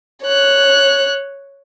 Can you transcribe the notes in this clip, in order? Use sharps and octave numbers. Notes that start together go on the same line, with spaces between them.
C#5 F#6